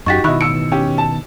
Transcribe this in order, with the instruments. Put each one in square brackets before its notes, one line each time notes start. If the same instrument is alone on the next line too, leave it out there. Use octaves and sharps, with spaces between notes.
[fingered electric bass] F#2 [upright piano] D#4 F#4 G4 [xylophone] C#6 A6 B6
[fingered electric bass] B2 D#3 [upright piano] E4 F#4 D#5 [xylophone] B5 C#6 F#6
[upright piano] A1 E6 C#7 [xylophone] D7
[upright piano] C#4 G4
A5